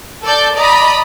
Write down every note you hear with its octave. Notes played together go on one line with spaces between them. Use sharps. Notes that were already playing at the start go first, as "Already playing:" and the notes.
A4 D5 G6
D5 D#5 A#5 B5